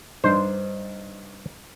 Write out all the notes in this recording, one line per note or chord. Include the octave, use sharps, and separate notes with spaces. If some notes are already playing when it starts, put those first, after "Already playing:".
G2 D4 D#4 C5